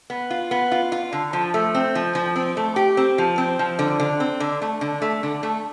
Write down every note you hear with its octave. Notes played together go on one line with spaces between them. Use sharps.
B3
F4
B3
F4
F4
D3
F3
A3
C4
F3
F3
C4
A3
G4
C4
F3
C4
F3
D3
D3
C4
D3
A3
D3
A3
D3
A3